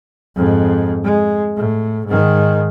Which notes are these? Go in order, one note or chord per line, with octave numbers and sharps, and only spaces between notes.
F2 G#2
G#3
A2
G#2 D#3